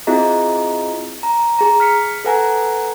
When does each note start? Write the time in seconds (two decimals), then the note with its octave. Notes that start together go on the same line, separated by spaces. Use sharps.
0.07 C4 E4 F4 G#4 D#5 A#5
1.23 A#5
1.59 G#4 A#5
1.80 F6 B6 C#7
2.25 A4 B4 F#5 G#5 A#5